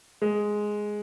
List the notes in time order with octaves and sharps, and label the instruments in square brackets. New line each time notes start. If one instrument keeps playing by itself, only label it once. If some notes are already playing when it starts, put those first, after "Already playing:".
[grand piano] G#3